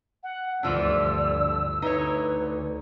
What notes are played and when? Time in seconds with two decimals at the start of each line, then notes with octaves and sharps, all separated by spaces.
0.23 F#5
0.63 D2 G2 E3 F3 D4 D5 E6
1.82 D2 D#4 E4 B4 C#5